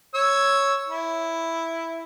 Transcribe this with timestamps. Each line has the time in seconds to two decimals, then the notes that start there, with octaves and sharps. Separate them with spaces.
0.14 C#5 E6
0.88 E4